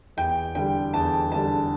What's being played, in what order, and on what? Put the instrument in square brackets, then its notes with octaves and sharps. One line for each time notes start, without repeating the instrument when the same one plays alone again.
[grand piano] E2 G5
D3 G3 G5
E2 A5
D3 G3 A5